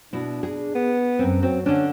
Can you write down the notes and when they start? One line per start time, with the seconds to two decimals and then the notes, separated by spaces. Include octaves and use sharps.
0.13 B2 D4 E4
0.43 G#4
0.75 B3
1.19 F#2 C4
1.43 F#3 C4
1.66 D3 C#4 D4